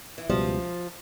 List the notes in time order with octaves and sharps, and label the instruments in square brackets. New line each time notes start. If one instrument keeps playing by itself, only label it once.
[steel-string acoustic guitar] E3
[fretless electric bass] C#2 B2 G3 [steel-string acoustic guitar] F3